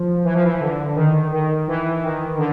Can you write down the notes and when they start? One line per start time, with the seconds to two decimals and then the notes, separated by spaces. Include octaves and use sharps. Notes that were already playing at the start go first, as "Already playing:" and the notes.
Already playing: F3
0.24 E3
0.34 F3
0.43 E3
0.61 D3
0.95 D#3
1.31 D#3
1.67 E3
2.03 D#3
2.38 D3